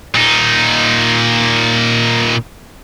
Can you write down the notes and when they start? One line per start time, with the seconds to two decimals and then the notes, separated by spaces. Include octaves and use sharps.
0.15 A#2 D#4